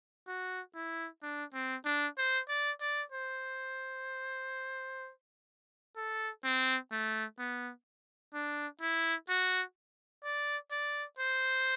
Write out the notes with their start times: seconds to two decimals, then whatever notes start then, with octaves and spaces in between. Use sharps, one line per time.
0.28 F#4
0.75 E4
1.22 D4
1.53 C4
1.85 D4
2.18 C5
2.49 D5
2.81 D5
3.12 C5
5.96 A4
6.44 C4
6.91 A3
7.39 B3
8.34 D4
8.81 E4
9.29 F#4
10.23 D5
10.71 D5
11.19 C5